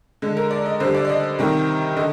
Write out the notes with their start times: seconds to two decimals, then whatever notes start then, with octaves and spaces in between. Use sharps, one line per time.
0.22 D3 G#3
0.37 A#4
0.51 D5
0.66 D#5
0.80 D3 G3 C5
0.94 D5
1.05 D5
1.09 D#5
1.39 C3 D#3 G3
1.97 D3 D#5